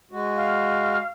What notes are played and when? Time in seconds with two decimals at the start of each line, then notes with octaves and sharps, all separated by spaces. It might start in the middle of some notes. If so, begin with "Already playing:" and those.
0.11 G#3 F#4
0.36 F5